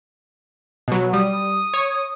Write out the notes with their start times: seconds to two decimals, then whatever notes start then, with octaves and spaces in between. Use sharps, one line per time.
0.88 B2 F#3
1.13 G3 D#6
1.74 C#5